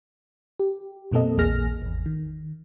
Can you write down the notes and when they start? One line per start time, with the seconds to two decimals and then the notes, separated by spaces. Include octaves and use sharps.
0.60 G4
1.12 F#2 B2 A#3 C4 A4 D#5
1.37 A#1 E2 A#3 G#4 F6 A#6
1.82 G#1 E2
2.06 D#3